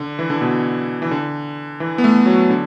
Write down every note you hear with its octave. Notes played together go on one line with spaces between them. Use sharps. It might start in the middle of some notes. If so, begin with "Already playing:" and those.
Already playing: D3
E3
D3
B2
E3
D3
E3
B3
A3
F#3
D3